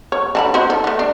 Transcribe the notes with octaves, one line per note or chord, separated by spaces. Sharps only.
C#5
D3 A5 B5
D#4 F#4 C5
A4
A3 B3
D4